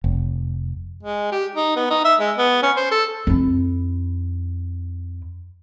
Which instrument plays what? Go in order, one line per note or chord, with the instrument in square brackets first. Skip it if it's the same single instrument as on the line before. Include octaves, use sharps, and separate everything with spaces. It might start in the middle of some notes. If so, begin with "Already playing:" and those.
[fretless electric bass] F1
[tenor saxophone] G#3
G4
D#4
B3
D#4
E5
G#3
B3
C#4
C5
A4
[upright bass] F2 E4